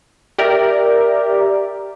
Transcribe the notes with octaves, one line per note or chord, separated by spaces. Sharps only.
G4 A#4 D5 E5